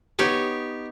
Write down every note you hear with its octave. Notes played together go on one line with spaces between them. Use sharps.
B3 D#4 G4 C#5